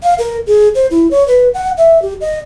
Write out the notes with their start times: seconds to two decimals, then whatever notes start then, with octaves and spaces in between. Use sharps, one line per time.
0.03 F5
0.18 A#4
0.47 G#4
0.75 C5
0.91 E4
1.11 C#5
1.28 B4
1.54 F#5
1.77 E5
2.02 G4
2.21 D#5